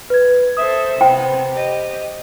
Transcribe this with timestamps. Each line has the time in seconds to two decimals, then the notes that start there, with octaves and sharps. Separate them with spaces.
0.10 B4 G#6
0.57 A4 C5 E5 D#6
1.01 C3 B3 C5 G5
1.51 G4 D#5